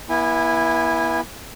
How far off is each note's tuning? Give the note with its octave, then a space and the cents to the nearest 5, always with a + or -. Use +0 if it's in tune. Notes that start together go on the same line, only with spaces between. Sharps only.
B3 -40 E4 +0 G#5 -25